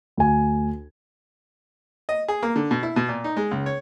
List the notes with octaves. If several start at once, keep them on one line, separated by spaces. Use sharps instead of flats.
D2 G#5
D#5
G#4
A#3
D3
B2
E4
B2
A#2
D#4
G#3
C#2
C#5